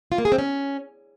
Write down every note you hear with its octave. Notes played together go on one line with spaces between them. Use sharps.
F4
A#3
G#4
C4
C#4